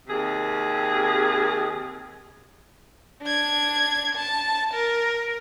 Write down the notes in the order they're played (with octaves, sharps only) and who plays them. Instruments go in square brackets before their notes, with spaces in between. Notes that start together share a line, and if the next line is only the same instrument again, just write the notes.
[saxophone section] D#2 C3 G#4
[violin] D4 G#6
A5
A#4